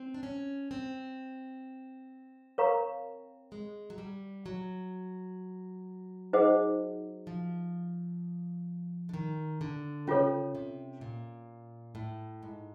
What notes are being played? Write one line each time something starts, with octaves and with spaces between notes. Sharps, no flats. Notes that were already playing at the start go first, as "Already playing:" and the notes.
Already playing: C4
D4
C#4
C4
A#4 C#5 F5 A#5 C#6
G#3
F#3
G3
F#3
D#4 G#4 C5 D#5 F#5
F3
D3
D#3
D3
C#3 C#4 F4 A4 C#5
C3
A#2
A2
G#2